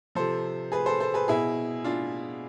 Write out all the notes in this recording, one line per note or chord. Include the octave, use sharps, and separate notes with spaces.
C3 F3 A4 C5
G#4 B4
A4 C5
A4 C5
G#4 B4
B2 E4 G#4
D4 F4